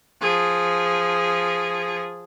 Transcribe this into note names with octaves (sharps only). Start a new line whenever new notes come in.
F3 G#4